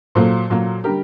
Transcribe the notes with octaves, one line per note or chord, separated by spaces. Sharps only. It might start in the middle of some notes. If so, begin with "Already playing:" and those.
A#2 F#3 A#3 A4 C5
A#2 F#3 A#3
D3 G3 G4 A#4